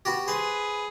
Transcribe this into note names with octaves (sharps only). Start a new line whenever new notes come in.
B3 F#4 G4
G#4 B4 C5